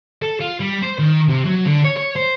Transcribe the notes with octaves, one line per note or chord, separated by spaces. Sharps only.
A4
F4
G3
C5
D#3
C3
F#3
D3
C#5
C#5
C5